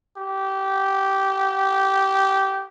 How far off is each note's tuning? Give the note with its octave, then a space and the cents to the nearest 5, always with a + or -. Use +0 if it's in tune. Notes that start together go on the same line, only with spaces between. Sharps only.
G4 -15